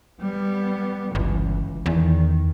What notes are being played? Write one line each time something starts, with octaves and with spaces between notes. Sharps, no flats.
G3 B3
G1 C#2 E3
E2 D#3